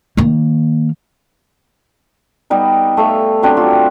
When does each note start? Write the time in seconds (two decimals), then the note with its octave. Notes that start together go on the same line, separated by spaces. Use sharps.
0.17 D#3 A#3
2.50 G3 B3 D#4
2.97 A3 E5 F5
3.42 F#3 C4 D4 G4
3.57 F4 F#4